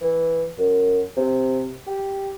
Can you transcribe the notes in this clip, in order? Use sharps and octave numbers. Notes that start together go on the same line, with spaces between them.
E3
F#2
C3
G4